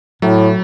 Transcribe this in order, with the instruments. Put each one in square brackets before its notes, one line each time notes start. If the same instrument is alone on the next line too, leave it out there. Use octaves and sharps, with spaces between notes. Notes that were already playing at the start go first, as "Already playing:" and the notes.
[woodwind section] A2 [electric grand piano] F#3